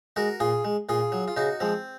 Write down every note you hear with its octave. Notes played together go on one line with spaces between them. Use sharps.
G#3 F#4 A#4
A#2 F4 G#4
G#3
A#2 F4 G#4
F#3
F4
C#3 D#4 F#4
F3 G#3 C4